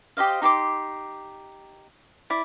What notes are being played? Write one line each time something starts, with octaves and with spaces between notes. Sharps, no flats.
G4 C5 D#5 F5
D#4 G4 C6 D6
E4 D5